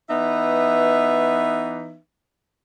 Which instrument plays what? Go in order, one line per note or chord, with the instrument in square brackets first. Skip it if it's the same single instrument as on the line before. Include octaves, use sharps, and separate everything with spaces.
[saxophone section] E3 B3 D#4 B4 E5